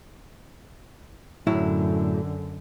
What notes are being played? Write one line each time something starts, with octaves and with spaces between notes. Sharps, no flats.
F#2 A2 D3 F#3 E4